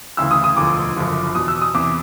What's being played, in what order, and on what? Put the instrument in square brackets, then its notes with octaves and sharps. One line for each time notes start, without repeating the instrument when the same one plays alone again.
[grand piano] D2 C#3 E3 E6
D#6
D#6
E1 D2 D3 F3 D6
F#1 F#2 D3 F3
E2 B2 D#6
E6
D#6
E2 C3 E3 D6